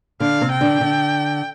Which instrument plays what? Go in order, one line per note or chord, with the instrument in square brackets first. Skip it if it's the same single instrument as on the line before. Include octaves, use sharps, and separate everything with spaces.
[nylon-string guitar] D3 D4 [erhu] F5
[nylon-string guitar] C3 C4
[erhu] G5
[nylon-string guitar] D3 D4
D3